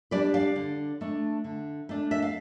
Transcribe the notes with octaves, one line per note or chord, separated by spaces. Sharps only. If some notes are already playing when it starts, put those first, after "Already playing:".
G3 D4 B4 D5
D5 F5
D3
A3 D4
D3
A3 D4
E5
F5